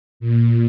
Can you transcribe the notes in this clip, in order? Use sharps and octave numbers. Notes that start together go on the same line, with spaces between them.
A#2